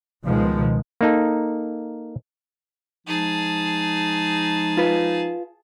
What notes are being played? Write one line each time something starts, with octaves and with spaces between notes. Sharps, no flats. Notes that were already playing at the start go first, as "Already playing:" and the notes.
C#2 B2 D#3 F3 G#3
A#3 D#4 A4
F3 G#3 D#4 G#4 A5
F4 B4